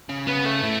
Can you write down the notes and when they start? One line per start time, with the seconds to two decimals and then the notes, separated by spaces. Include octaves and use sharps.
0.09 C#3
0.27 B3
0.45 A3
0.63 A2